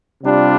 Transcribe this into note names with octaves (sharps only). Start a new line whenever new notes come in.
C3 G3 D4 F4